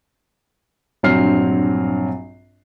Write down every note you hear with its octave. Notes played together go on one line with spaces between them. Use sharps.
A#1 G2 F#3 C4 F6 C7